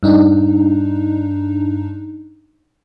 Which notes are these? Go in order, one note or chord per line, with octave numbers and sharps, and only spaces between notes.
G2 D4 D#4